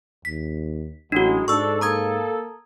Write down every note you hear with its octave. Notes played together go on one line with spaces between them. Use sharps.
D#2 B6
A1 F#3 G#3 D4 F#4
G#2 D4 A4 C#6 E6
A#3 A4 A#5 D#6 G#6